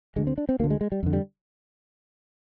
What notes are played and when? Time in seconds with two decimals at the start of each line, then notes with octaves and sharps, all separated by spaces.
0.16 D2 D3 G#3
0.27 C4
0.38 D4
0.49 C4
0.60 D2 A#3
0.64 D3
0.70 G#3
0.81 G#3
0.92 G3
1.03 F2 D3
1.13 G3